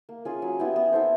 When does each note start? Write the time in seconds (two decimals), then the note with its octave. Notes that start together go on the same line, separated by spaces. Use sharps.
0.09 A#3
0.25 C#4 F4 G#4
0.42 F#3
0.59 B3 E4 G4
0.76 B3
0.92 E4 A4 C5